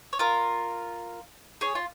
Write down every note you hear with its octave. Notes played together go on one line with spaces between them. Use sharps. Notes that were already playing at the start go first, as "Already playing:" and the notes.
C#5
F4 A#4
G#4 C#5
F4